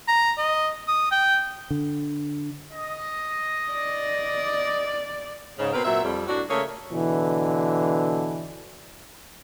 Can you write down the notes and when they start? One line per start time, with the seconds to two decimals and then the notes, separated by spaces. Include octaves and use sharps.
0.08 A#5
0.38 D#5
0.88 D#6
1.12 G5
1.71 D3
2.72 D#5
3.72 D5
5.59 G#2 C#3
5.73 B2 A#3 C4 A#4 B4
5.85 A#2 F#3 C4 E5
6.04 F2 G3
6.28 A2 D4 F#4
6.49 C#3 A3 A#3 G#4 A#4 C#5
6.91 B2 D3 E3